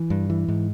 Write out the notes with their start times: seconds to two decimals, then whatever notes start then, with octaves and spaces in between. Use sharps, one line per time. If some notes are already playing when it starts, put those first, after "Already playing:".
Already playing: E3
0.10 G2
0.30 E3
0.48 G#2